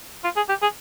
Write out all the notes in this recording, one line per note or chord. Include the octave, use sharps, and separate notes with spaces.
F4
G#4
G4
G#4